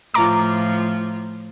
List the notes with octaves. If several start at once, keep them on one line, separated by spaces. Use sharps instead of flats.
A2 F3 F4 A#5 D6